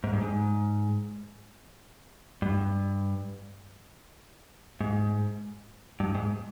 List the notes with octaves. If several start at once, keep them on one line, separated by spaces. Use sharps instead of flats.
G#2
G2
G#2
G2
G#2
G2
G#2